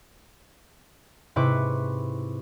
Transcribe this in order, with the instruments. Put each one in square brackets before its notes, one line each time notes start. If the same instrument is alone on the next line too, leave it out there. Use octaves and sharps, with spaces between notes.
[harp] G#2 C3 E4 B4 C#6 D6